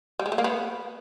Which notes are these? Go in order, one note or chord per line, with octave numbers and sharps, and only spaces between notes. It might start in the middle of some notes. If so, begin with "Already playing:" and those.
G3
G#3
A3
A#3
B3